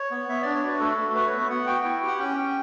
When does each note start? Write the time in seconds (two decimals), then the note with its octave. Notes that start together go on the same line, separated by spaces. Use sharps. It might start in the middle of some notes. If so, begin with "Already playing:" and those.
Already playing: C#5
0.11 B3
0.29 B3 E5
0.42 D4 D5
0.55 C#5
0.63 F#4 B4
0.80 A3 A4
0.97 A3
1.15 F#4 B4
1.27 B3 C#5
1.38 E5
1.49 B3 F#5
1.67 F#4 G5
1.84 E4
2.02 G4
2.08 F#5
2.19 C#4 G5
2.37 C#4